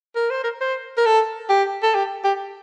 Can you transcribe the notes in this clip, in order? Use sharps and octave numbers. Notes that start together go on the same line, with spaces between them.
A#4
C5
A#4
C5
A#4
A4
G4
A4
G4
G4